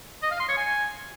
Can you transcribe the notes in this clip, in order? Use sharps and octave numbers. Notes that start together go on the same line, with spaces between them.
D#5
F5
C6
C#5
G#5